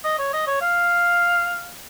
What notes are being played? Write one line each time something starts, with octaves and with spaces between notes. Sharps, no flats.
D#5
C#5
D#5
C#5
F5